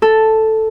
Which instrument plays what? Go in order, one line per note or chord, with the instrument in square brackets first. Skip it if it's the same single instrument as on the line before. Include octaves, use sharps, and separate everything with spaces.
[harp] A4